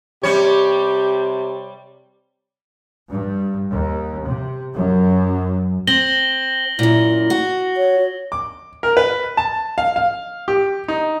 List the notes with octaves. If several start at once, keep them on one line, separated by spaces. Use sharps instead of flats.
C3 G3 G4 C#5
G2
D#2
C3
F#2
C4 A#6 F#7 G7
F#2 A#2 E4
F#4
C#5
D6
A#4
B4
A5
F5
F5
G4
D#4